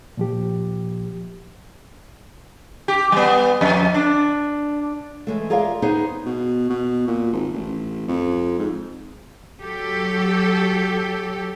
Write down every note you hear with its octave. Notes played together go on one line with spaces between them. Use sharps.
A#2 F3 G4
G4
G3 B3
F2
D4
E3 G#3 A3
F4 G#4 A#4 D5 E5 F5
B3 D#4 G#4 B4 C5
B2
B2
A#2
G#1
A1
F2
G#2
F#3 G4 A4